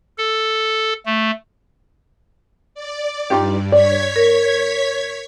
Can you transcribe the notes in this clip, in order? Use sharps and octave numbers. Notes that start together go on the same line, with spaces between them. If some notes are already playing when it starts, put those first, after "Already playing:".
A4
A3
D5
G2 D#4 F4 G4
C#5 D5 G#6 B6
A#4